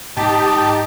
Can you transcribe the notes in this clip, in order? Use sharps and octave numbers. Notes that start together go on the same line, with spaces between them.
G#2 D#4 G4 A5